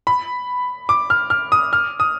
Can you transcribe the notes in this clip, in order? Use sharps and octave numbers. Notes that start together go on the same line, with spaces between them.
B5
D6
F6
F6
D#6
F6
D#6